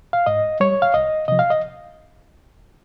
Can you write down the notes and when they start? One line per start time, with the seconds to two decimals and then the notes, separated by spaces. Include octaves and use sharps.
0.13 F5
0.26 G#2 D#5
0.60 G3 C#5
0.82 F5
0.94 C2 D#5
1.28 C3 F3 D#5
1.39 F5
1.50 D#5